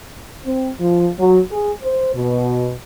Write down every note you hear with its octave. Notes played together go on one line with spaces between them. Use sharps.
C4
F3
F#3
G#4
C5
B2